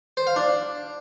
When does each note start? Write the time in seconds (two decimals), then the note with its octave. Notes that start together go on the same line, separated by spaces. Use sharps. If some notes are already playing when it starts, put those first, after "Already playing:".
0.17 C5
0.27 F5
0.36 D4